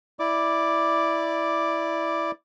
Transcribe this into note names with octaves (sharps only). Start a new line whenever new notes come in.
E4 D5 D6